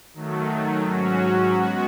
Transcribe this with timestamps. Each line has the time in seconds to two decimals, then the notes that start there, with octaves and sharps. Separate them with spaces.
0.14 D#3 F#3 A3
0.84 G#2 F#3 C#4 F#4
1.54 G#3 B3 F#4